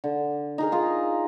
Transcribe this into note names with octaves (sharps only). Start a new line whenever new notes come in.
D3
D#4 G#4 A#4
F4 G#4